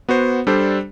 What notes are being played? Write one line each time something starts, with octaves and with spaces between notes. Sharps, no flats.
B3 F#4 C5
G3 D4 A4 C5